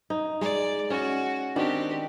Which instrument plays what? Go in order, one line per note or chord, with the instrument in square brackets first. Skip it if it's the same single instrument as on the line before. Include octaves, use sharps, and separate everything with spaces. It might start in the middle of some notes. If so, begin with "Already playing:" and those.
[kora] D#4
[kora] G#3 [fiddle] D5
[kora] C#4 [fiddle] F#4
[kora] D#3 D4 F#4 [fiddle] C4 G4